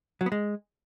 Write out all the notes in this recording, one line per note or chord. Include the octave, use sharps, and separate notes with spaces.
F#3
B3
G#3